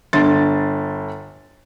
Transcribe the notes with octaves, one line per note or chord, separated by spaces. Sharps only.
G1 D3 C6 A6